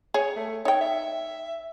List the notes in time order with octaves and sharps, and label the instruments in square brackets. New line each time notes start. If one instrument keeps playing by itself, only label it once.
[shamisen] G#4 [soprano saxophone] C#5
[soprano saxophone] A3
[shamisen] D#4 G5 [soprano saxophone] C#5
[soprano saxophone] E5